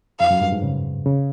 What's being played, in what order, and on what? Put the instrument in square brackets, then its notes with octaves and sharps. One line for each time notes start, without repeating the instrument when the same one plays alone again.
[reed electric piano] F2 [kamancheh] F5
[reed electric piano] F#2
G2
G#2
C#3
C#3